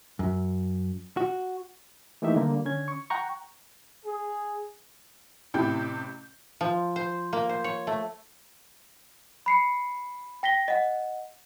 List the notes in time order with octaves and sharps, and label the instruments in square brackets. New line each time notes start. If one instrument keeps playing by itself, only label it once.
[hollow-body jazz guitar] F#2
F#4
[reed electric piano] E3 A3 A#3 D#4 G4 E5
D3 G3 A#3
D3 C#4 G#6
C#6
F#5 G5 A#5 C#6
[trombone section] G#4
[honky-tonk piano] A1 C3 E4 G5 G6
[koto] F3
C5
A#3
C5
C#5
A3
[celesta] B5 C7 C#7
G5 A#6 B6 G7
D#5 F#5